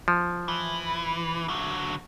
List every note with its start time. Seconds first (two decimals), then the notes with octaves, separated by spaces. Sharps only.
0.08 F3
0.48 E3
1.48 D3 F#3